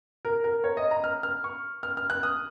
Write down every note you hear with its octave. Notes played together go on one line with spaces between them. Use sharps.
A#4
A#4
C#5
D#5
A#5
F6
F6
C#6
F6
F6
F#6
D#6